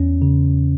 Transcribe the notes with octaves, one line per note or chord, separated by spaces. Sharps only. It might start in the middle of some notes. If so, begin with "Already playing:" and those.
Already playing: E2 C#4
C#3